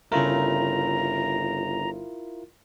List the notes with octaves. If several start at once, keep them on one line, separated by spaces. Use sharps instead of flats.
G1 C#3 A3 E4 F4 A#4 A#5